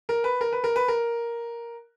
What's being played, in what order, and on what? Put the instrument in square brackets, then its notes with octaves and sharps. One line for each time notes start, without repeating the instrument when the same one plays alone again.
[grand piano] A#4
B4
A#4
B4
A#4
B4
A#4